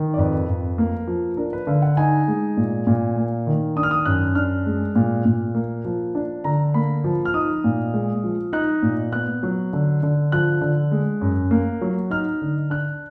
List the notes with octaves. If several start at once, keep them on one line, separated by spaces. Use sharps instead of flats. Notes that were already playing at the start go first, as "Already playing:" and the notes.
Already playing: D#3
D5
F2 B4
F2
A#3
F3
D4 A#4
B4
D3 F5
F#5
D#4 G#5
G#3
A#2
A#2
A#3
D#3
D4 D#6
F6
D#6
F#2 F#6
D4 F6
G#3
A#2
A#2
A#3
F3
D4
D3 A#5
A#3 B5
F3
F6
D#4 D#6
A#2
G#3
F3
D#4 F#6
A#2
B3 F#6
F#3
D3
D3
F3 F#6
D3
G#3
F#2
A#3
F#3
D#4 F6
D3
D4 F#6